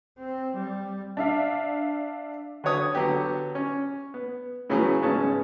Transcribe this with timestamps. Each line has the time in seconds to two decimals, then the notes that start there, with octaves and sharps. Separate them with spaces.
0.19 C4
0.57 G3
1.17 D4 E5 F5
2.64 D3 F#4 B4 C#5 D#6
2.95 D3 F#3 B3 G4
3.55 C#4
4.14 B3
4.70 A2 C#3 E3 F#3 B3
5.01 G#1 C#3 B3 C#4 A5